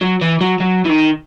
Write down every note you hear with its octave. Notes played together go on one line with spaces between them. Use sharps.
F#3
E3
F#3
F#3
E3
D#3